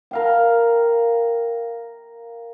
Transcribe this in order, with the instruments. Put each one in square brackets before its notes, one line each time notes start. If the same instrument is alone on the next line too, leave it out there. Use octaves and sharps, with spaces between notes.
[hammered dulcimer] A#4 F5 G5